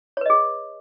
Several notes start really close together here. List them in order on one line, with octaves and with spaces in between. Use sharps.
C#5 B4 D#5 G#4